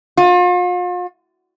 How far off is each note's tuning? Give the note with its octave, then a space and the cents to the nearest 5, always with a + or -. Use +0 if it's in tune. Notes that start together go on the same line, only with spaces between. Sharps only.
F4 +40